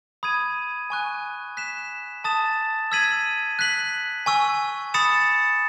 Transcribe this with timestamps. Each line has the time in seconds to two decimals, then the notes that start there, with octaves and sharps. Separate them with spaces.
0.23 B5 D#6 G#6 D#7
0.90 G#5 C#6 F#6
1.57 F#6 B6 E7
2.24 A5 D#6 A6 E7
2.92 E6 G#6 B6 D#7 F#7
3.59 F#6 B6 F#7
4.26 G#5 C#6 E6
4.94 B5 D#6 A6 C#7 E7